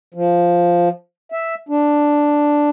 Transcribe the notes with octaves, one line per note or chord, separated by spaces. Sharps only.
F3
E5
D4